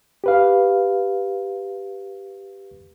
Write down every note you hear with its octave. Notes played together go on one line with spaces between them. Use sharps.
G4 B4 F5